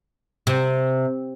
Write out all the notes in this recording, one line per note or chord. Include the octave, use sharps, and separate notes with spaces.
C3